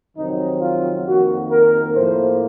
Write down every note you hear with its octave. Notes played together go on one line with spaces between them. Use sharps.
F2 C3 D#3 F#3 C4 D#4
F4
F2 D#3 A#3 F#4
A#4
A2 F3 A#3 C5